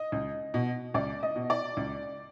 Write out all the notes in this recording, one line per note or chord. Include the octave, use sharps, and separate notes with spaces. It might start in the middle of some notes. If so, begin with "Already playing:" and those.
Already playing: D#5
C#2
B2
C#2 D5
D#5
B2
D5
C#2